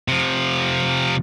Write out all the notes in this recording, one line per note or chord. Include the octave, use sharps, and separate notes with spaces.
C3 F3